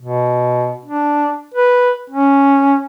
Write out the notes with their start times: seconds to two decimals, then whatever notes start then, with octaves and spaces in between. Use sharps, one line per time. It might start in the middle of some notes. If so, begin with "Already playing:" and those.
0.02 B2
0.85 D4
1.54 B4
2.10 C#4